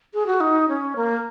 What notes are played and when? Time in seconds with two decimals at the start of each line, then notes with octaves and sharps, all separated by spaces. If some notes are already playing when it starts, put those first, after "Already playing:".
0.14 G#4
0.27 F#4
0.40 D#4
0.69 C#4
0.96 A#3